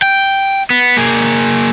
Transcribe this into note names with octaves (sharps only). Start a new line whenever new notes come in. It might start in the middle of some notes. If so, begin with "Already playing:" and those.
G5
B3
A#3 G#4